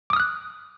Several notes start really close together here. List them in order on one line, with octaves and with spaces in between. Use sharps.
D6 D#6 F6 F#6